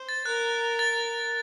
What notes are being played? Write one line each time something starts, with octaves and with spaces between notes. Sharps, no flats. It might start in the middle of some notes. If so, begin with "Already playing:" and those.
Already playing: C5
A6
A#4 F#6
A6